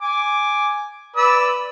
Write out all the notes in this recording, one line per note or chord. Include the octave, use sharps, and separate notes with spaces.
G#5 D6
B4 D5 E6